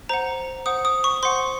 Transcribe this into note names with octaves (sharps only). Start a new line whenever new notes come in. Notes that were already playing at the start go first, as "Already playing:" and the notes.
C5 F#5 A#5
C5 F#5 D#6
D#6
C#6
C5 F#5 C6